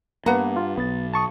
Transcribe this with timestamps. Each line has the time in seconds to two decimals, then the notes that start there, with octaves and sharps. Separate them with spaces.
0.26 G2 A#3 B3 B4 F#5 A#5
0.56 F4
0.78 B1 B3 A6
1.14 A5 C#6 D#6